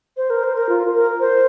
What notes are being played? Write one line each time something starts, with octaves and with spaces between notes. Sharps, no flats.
C5
A#4
C5
A#4
F4
A#4
C5